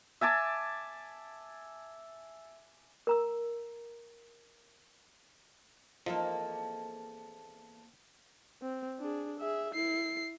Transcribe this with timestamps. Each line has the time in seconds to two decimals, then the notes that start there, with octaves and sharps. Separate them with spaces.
0.21 E5 G#5 A5 D6
3.07 A#4 A#5 E6
6.06 E2 F3 A#3 C4 D#4 A4
8.62 C4
9.00 D4 G#4
9.40 G#4 E5
9.74 E4 C7